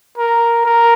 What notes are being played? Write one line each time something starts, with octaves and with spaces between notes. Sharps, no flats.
A#4
A#4